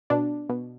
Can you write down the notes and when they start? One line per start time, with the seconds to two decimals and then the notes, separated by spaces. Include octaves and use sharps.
0.10 B2 D4
0.49 B2